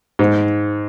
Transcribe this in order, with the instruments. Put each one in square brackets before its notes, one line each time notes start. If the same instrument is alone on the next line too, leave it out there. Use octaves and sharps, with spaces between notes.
[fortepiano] G#2